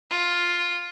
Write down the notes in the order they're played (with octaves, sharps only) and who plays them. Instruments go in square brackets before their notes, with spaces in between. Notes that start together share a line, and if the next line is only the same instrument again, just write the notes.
[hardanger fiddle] F4